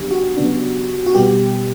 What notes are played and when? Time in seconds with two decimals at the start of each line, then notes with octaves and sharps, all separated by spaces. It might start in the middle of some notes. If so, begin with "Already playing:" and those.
Already playing: C#3 F#3 B3 D4 G4
0.11 F#4
0.36 C#3 F#3 B3 D4
1.06 F#4
1.14 B2 G3 B3 G4